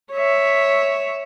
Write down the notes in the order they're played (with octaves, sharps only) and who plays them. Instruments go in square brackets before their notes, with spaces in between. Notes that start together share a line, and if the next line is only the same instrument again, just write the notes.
[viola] C#5 E5